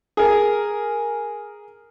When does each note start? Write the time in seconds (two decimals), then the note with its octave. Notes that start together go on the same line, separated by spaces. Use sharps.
0.17 G#4 A#4